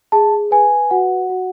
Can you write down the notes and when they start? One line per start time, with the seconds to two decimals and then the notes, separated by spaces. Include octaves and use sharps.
0.12 G#4 A5
0.51 B4 G#5
0.91 F#4 F#5
1.30 F#4